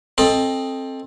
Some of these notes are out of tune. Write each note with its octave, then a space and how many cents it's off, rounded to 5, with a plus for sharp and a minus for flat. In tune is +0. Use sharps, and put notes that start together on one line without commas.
C4 +20 A4 +0 D#5 +0